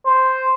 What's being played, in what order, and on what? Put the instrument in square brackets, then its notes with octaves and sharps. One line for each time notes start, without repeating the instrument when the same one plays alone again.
[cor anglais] C5